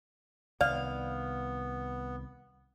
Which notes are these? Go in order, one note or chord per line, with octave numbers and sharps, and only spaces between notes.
C2 D#3 B3 D5 F5